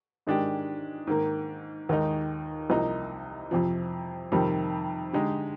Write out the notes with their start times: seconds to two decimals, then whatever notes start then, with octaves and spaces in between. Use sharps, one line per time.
0.27 G#2 D#3 G#3 D4 G4
1.07 G#2 D#3 A#3
1.89 D#2 D#3 G#3 D#4
2.70 C2 C3 F3 A#3 D#4
3.51 F2 C3 F3
4.32 F2 C3 D#3 G3
5.13 D3 G#3 D#4 G4